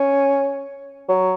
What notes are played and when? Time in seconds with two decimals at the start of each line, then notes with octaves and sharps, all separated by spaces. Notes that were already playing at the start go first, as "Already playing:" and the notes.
Already playing: C#4
1.09 F#3